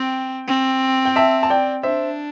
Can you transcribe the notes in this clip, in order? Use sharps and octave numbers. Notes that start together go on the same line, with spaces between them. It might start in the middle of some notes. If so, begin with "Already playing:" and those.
Already playing: C4 G5
C4
G5
E5 A5
A5
D5 G5
D4 C5 E5